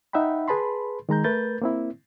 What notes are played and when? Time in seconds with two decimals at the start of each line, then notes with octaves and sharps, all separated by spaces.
0.13 D#4 E5 F#5 G5 B5
0.48 G#4 B4 A5 B5 C6
1.09 D#3 G#3 A#5 G6
1.24 A3 A#4 B4 G6 A6
1.62 A#3 C4 E4